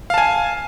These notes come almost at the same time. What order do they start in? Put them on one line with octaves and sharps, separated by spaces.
F5 A5 G#5